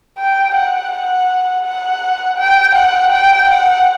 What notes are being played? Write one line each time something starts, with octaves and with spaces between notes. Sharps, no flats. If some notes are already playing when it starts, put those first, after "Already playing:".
G5
F#5
F#5
F#5
G5
F#5
G5
F#5